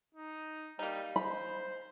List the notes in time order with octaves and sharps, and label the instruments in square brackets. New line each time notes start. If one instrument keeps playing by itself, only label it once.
[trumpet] D#4
[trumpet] G3 [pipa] A#3 D#4
[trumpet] C5 [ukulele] B5